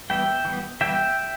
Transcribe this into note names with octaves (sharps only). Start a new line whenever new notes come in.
E3 G3 B3 E5 G5
E3 G3 B3
E3 G3 B3 E5 G5